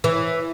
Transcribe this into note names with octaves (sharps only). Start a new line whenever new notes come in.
E3